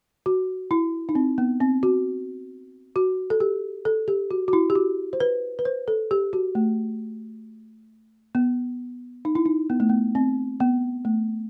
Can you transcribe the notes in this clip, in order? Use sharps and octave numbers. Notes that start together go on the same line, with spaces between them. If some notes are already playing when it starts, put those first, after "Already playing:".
F#4
E4
D#4
C4
B3
C4
F#4
F#4
A4
G4
A4
G4
F#4
F#4
E4
G4
F#4
C5
B4
B4
C5
A4
G4
F#4
A3
B3
D#4
E4
D#4
B3
A3
B3
C4
B3
A3